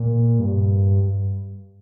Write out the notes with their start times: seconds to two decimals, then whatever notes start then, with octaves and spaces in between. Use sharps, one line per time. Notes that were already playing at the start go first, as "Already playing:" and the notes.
Already playing: A#2
0.39 G2